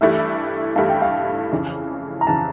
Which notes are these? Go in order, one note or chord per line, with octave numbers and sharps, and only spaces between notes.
G2 E3 A3 E4 G4 E5
G2 E3 A3 E4 G4 F5
G5
F5
F2 C#3 E3
A#5
F2 C#3 E3 A5